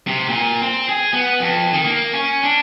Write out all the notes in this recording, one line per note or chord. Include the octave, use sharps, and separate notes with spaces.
C3
A#2
C4
G#4
B3
F2
D#3
A#3
C#4
D4